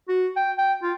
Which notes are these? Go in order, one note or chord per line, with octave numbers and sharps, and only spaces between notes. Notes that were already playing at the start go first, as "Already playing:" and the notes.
F#4
G5
G5
F4